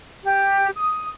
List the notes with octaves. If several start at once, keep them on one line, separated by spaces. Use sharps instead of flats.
G4
D#6